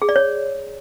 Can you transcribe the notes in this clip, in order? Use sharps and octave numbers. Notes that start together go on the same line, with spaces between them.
G#4
D5
C#5